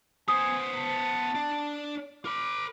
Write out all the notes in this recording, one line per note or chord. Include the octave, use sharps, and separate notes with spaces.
B3 C5 G#5 D#6
A5
D4 D5
A#4 B5 D6